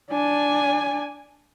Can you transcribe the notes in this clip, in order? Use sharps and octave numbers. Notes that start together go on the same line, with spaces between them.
D4 G#5